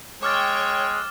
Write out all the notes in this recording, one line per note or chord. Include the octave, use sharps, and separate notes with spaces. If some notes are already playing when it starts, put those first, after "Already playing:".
G#3 C#5 G5 D6 F6 A6